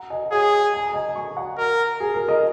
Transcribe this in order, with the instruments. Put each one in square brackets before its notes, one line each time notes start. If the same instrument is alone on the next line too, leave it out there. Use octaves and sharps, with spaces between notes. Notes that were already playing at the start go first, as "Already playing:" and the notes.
Already playing: [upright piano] F#5 A#5
D#5 G#5
[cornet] G#4 [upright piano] C#5 F#5
[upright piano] G#5
A#5
D#5 G#5
G#5 C#6
F#5 A#5
[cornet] A#4
[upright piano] G#4
A#4
A#4 D#5